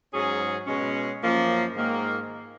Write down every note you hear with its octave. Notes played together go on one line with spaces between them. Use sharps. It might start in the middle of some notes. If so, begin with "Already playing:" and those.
G#2 F#3 C#4 G#4
B2 G#3 C#4
F#2 F3 A#3 C#4
G#2 D#3 A#3